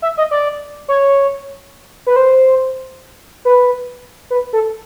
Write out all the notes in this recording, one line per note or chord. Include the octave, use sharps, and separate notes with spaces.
E5
D#5
D5
C#5
B4
C5
B4
B4
A4